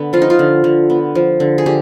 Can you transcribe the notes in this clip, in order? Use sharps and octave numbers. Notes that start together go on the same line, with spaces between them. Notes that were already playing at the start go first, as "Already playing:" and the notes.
Already playing: D3 B3
F3 F4
D#4
F4
D3
D3
B3
F3
D3
G#4
D3 G4